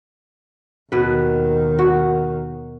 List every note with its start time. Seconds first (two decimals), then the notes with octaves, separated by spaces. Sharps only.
0.92 D#2 B2 D#3 B4
1.79 F#4